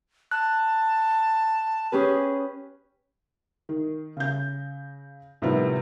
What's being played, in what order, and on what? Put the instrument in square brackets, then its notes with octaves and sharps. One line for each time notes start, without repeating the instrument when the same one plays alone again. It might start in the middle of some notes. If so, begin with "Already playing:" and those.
[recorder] A5 [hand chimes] F#6
[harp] C#4 G4 B4 [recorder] G#4
[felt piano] D#3
C#3 G6
A2 C3 D#3 F3 G3 B3